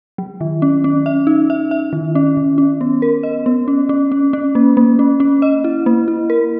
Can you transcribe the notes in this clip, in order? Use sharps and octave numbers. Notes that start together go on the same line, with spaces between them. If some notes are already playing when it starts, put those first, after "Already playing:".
F#3
D#3
C#4
C#4
E5
D#4
E5
E5
D#3
C#4
D#3
C#4
B3
A#4
D#5
B3
C#4
C#4
C#4
C#4
A#3
A#3
C#4
C#4
D#5
E4
A#3
E4
A#4